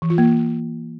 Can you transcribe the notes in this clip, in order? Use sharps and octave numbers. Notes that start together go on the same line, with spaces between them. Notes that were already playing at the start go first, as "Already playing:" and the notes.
E3
F4
A#3